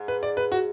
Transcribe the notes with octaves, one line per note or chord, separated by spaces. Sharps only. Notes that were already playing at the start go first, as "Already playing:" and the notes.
Already playing: G#2
B4
D5
B4
F#4